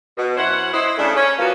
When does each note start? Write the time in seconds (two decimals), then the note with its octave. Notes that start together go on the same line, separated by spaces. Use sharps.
0.18 B2
0.37 F#2 C#4 E4 C5 F#5
0.72 E4 C5 D#5
0.98 C#3 A3 D4
1.16 C#4
1.38 F3 F#3 A#3 B3 F4 F#4